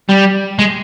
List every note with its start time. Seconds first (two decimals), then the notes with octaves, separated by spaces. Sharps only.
0.09 G3
0.59 G#3